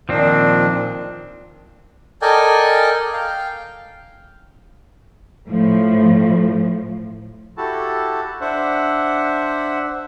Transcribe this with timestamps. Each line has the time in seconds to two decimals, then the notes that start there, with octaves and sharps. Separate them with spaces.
0.09 A#2 D#3 F3 C4 D4
2.22 A4 A#4 D5 D#5 G5 G#5
3.13 F5 G5
5.46 A2 F3
7.57 E4 F#4 G4 A4 A5
8.41 D4 C5 E5 F#5